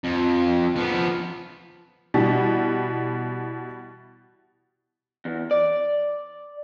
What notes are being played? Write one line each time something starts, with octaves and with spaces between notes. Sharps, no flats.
F2
F3 B3
B2 E3 G3
E2
D5